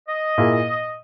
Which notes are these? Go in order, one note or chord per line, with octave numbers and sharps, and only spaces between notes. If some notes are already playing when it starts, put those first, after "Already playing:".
D#5
A#2 A#3 E4 G#4